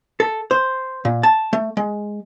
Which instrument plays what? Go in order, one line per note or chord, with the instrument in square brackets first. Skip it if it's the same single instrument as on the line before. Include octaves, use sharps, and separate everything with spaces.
[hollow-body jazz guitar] A4
C5
A#2
A5
A3
G#3